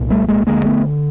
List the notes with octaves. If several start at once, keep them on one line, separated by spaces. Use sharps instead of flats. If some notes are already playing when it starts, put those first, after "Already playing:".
Already playing: C2 A#2
G3 A3
G#3 A#3
D2 D3 G#3 A#3
A3 B3